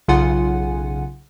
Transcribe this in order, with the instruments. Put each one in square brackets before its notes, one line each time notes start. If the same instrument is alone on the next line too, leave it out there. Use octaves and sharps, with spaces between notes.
[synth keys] B1 C#3 F4 F#5 G#5